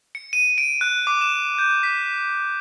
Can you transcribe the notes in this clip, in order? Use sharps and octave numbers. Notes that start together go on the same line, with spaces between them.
C#7
D#7
D7
F#6
D6
E7
G6
B6